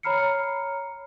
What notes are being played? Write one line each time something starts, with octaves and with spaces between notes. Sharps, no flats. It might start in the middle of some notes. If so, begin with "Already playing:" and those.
C#5 A#5 B5 F6 C7 C#7